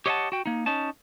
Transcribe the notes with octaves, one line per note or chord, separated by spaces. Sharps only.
G4 C#5 D#5 E5 F#5 A5
F#4 G5
A#3 D#4
C#4 D#4 A5